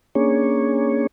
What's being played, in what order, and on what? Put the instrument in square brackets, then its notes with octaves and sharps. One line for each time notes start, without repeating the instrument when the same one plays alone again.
[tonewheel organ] A#3 C#4 D4 G#4 C#5